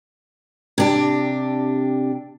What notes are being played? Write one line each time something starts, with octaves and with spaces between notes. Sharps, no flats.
C3 D4 G4